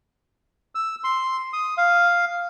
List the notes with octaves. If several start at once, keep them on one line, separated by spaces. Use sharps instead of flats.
E6
C6
D#6
F5